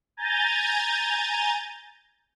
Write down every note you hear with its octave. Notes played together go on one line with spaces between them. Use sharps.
G#5 A#5 G6 A6